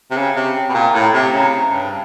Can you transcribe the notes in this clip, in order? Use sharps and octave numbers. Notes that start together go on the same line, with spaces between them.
C3
C#3 G5
C3
B2
A#2
A2 A#5
C3
C#3
G2 A5